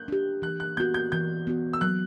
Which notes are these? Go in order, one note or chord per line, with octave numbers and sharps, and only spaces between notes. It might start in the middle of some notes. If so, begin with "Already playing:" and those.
Already playing: F#6 G6
D4 G4
E3 F#6
F#6
B3 F#4 G6
G6
E3 G6
B3 F#4
E6
F#3 F#6